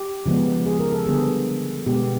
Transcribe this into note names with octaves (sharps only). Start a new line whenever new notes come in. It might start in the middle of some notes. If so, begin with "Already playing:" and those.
Already playing: G4
C#3 F3 G#3 B3
G#4
A#4
A4
D3 G3 B3 G#4
B2 G#3 B3 G4